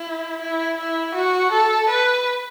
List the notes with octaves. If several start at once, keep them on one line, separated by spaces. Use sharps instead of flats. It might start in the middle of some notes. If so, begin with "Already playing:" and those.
Already playing: E4
E4
E4
F#4
A4
B4